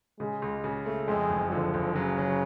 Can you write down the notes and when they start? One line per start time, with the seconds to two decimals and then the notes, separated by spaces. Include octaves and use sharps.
0.20 C#3 G#3
0.42 C#2
0.64 C#3
0.86 A3
1.08 F2 G#3
1.30 F#1
1.52 D3 F3
1.74 F#1
1.95 C#3 F#3
2.18 F#3